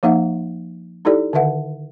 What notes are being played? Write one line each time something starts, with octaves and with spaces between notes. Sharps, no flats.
F3 A#3 D#4 E5 F#5
D#4 E4 G4 A4 D5
D3 D#3 B4 E5 F#5